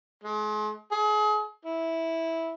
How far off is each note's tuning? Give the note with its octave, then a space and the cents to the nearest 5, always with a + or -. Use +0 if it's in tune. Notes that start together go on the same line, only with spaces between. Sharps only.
G#3 +40
G#4 +35
E4 -10